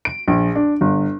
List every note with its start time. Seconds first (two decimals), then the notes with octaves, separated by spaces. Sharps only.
0.05 D7
0.28 A#1
0.55 D4
0.81 G1